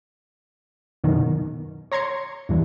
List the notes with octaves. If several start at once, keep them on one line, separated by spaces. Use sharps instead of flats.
F#2 B2 D#3
C#5 A#5 C6 G#6 C#7
E2 G2 E3